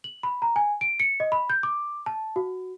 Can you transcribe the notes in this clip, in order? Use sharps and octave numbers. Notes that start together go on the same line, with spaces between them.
F#7
B5
A#5
G#5
D7
C#7
D#5
B5
G6
D6
A5
F#4